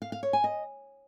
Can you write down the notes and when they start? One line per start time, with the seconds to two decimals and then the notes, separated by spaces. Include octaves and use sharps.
0.02 F5
0.12 F5
0.23 C#5
0.33 G#5
0.44 D#5